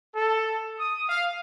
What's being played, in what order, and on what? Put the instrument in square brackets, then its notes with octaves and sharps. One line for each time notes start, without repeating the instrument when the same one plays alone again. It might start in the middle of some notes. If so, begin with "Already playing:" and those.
[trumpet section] A4
D#6
F5